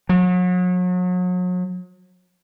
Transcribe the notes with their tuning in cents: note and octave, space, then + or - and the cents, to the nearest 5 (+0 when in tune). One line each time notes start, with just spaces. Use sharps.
F#3 -35